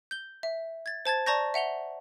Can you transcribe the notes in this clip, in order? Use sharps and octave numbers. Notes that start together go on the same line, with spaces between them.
G6 G7
E5
G#6 A6
C5 A5 G#6 A6
D5 A5 A#5 C#6 G6 A#6
E5 F#5 F7 G7